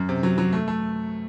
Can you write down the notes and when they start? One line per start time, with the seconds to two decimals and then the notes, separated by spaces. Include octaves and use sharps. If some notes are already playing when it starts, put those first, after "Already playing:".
Already playing: F#2
0.09 C3
0.23 F#3
0.38 F#3
0.53 A3
0.68 A3